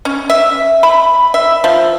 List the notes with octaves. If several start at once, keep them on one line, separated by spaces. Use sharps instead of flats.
C#4
E5
B5
E5
F3